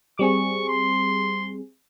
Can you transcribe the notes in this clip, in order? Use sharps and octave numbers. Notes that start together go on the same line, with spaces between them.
G3 C4 G#4 C#6
C6